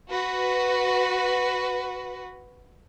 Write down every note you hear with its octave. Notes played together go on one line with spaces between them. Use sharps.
F#4 B4